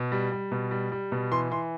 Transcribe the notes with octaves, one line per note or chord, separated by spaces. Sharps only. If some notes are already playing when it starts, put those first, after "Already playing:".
Already playing: B2
G3
G3
B2
G3
G3
B2
E3 C6
E3 C6